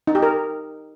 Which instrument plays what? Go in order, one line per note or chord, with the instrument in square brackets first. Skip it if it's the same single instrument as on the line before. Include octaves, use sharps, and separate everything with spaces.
[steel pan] D#4
G4
A#4